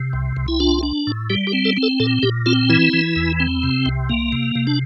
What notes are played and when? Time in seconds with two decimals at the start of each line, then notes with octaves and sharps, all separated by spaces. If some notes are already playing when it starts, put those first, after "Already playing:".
Already playing: C3
0.13 C2
0.36 C2
0.48 E4
0.60 D4 F4
0.83 D4
1.07 A2
1.30 G3 G4
1.47 G4
1.53 C4
1.65 A4
1.77 C4
1.83 A4
2.00 A#2 A4
2.23 A#2 G4
2.46 C4 F4
2.69 E3 E4
2.93 E3
3.16 E2
3.40 C4
3.63 C3
3.86 C2
4.09 A#3
4.32 C3
4.55 C3
4.67 D4